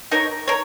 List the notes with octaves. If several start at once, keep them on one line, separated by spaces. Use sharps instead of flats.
D#4 A#4 C#5
A#4 C#5